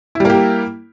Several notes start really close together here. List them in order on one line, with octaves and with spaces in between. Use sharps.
E4 G3 A#3 G4 A#4